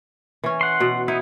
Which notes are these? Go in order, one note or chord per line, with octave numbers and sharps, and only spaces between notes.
E3 C#4
F#5 C6
B2
B3 D#4 E4